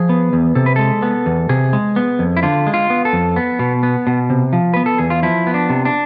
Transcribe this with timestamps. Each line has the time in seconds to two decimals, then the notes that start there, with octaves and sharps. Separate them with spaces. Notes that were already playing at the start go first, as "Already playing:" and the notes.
Already playing: F3 G#4
0.09 B3
0.33 E2
0.55 C3 A4
0.66 B4
0.76 G#3 A4
1.03 B3
1.26 E2
1.49 C3 G#4
1.73 G#3
1.96 B3
2.19 F2
2.37 E4
2.43 D3 F4
2.67 G#3
2.74 F4
2.90 B3
3.05 A4
3.13 F2
3.36 B3
3.59 B2
3.83 B3
4.07 B2
4.30 C3
4.53 F3
4.74 B3 B4
4.86 A4
4.98 E2 G#4
5.10 F4
5.23 F3 E4
5.47 B3
5.54 D4
5.70 C3
5.85 D4